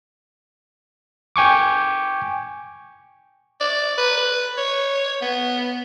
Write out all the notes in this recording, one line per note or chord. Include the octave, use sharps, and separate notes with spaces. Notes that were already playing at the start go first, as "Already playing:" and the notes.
G5 G#5 C#6 D6
D5
B4
B4
C#5
B3